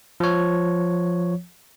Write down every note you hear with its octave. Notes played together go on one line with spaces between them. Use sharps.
F3 C#5